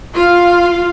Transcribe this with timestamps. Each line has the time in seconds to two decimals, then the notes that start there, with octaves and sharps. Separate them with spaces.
0.14 F4 F5